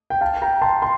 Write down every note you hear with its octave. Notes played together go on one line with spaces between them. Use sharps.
G5
F5 A5
G5 A#5
A5 C6
C6